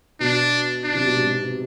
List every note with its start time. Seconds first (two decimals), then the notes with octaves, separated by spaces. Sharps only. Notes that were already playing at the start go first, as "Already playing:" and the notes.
0.20 B2 D4
0.84 D4
0.94 C3
1.05 B2
1.16 G#2